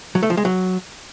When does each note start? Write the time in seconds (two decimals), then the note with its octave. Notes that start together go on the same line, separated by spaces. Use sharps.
0.15 F#3
0.23 A3
0.30 F3
0.37 G#3
0.45 F#3